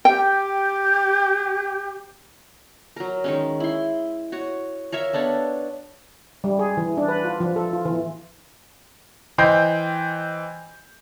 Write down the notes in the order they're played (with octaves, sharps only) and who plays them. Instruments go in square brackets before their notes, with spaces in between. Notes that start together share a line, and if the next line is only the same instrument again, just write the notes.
[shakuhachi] G4 [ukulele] G5
[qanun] F#3 A#4
D#3 G#3 C#4
E4 C6
F#4 C#5
A#4 C#5 E5 F5
B3 D4 A4 C#5
[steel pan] G3
G#4
E3
D4
B4
F4
F3
A4
F4
E3
[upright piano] E3 C5 D#5 G5 G6 C7